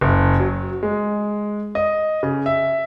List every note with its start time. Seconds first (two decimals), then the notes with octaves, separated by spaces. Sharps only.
0.01 F#1
0.40 F#3
0.83 G#3
1.75 D#5
2.23 C#3
2.46 E5